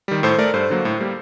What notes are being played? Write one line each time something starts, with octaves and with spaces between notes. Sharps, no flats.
D#3 G3
A2 A4 C5
A3 A#4 D5
G2 A4 C5
D3 F#3 A#3
A2
G3 A#3